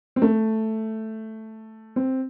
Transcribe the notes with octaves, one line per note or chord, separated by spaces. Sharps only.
C4
A3
C4